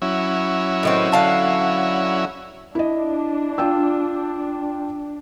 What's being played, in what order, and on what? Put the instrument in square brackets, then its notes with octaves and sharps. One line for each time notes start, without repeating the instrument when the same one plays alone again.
[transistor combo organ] F#3 C#4 E4
[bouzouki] A2 D#3 C4
D3 F5 A5
[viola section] D4 [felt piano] E4 D#5
[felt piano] F4 G5 E6